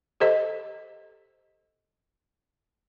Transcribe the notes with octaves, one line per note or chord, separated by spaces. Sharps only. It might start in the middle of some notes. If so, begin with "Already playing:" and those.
G4 A4 C5 D#5